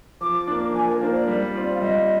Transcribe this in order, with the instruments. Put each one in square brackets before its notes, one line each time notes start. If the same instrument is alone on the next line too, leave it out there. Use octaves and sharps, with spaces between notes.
[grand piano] F3 [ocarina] D6
[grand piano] A#3 D4
[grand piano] F3 [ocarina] G#5
[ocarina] A#4
[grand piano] A#3 D4 [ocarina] C5
[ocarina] D5
[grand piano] G3
C4 F4
[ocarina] F5
[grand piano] G3 [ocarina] D#5